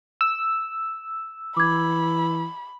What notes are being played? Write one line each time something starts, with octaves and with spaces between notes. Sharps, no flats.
E6
E3 B5 D6 G#6